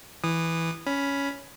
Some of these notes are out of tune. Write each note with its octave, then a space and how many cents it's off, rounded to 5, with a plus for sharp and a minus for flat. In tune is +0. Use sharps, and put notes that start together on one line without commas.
E3 +0 D#6 -20
C#4 +10 B5 -5